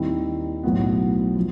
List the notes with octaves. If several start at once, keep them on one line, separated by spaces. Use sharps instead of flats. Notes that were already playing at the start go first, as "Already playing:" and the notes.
Already playing: D#2 D#3 G3 C4 E4
B1 A2 F#3 B3
F3